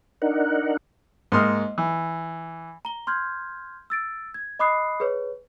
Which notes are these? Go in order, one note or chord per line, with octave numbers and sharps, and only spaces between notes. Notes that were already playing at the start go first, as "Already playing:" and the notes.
D4 D#4 A#4 F#5
G#2 A#3 C6 D#6 F6
E3
A#5 G7
C6 F6 G6 G#6
E6 A6 D7
G#6
D#5 B5 D6 D#6 F#6 C7
G#4 B4 C#5